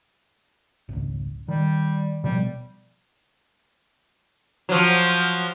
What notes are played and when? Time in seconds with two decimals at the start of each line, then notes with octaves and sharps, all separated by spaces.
0.89 G#1 C#2
1.48 D#3 G3
2.24 B2 F3 G3 B3
4.69 F3 F#3